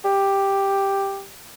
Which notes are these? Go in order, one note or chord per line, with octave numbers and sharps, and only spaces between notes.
G4